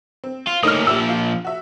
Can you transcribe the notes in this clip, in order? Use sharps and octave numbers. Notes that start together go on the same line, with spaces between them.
C4
F4
A3 A#3 C#4 D#4 D#6 F6
A#2 F3 G4 E5 E6
F4
F#4 E5